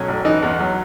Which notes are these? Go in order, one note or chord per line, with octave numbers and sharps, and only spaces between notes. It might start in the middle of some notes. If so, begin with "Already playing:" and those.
Already playing: B1 F#3 C#4
A1
E3 D#4
E2
F#3